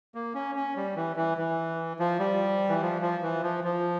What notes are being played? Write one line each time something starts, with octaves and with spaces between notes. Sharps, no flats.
A#3
C#4
C#4
G3
E3
E3
E3
F3
G3
E3
F3
F3
E3
F3
F3